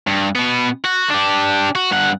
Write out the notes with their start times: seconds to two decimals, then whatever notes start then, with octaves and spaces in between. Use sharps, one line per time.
0.07 G2
0.36 B2 B3
0.85 F#4
1.10 D4 G4
1.76 F#4
1.92 G2 F#5